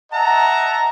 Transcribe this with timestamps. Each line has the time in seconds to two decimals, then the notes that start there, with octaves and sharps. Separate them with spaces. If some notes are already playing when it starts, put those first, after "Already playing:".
0.12 D#5 E5 F#5 A5 A#5